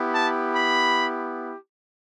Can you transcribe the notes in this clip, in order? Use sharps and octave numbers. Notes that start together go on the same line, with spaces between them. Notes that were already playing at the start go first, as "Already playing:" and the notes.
Already playing: B3 E4 G4
A5
B5